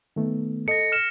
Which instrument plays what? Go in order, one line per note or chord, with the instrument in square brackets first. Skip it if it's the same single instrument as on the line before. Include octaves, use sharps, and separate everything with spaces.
[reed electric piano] D#3 A3 B3
[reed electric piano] A4 D#5 [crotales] A#6 C#7
[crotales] F6 E7